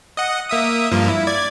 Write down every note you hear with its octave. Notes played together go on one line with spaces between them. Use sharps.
D#5 F#5
A#3 E5 D#6
G2 F3 A#3
E4
D5 G#6